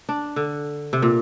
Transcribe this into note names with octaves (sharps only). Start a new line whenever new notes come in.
D4
D3
C3
A#2